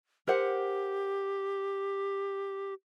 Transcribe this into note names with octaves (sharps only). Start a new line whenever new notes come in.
G4 A#4 C5 F#5